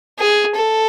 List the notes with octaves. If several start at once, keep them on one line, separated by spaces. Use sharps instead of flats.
G#4
A4